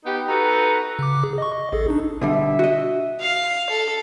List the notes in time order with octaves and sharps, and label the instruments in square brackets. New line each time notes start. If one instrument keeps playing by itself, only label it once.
[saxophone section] B3 D#4 G4
D#4 F#4 A4 B4
[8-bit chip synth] C#3 D6
G#4
D#5 C#6
D#5
A1 G#4 A4
D4 D#4
[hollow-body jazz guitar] B2 D3 G3 [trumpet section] E5
[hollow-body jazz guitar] F#4 D#5
[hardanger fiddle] F5
A4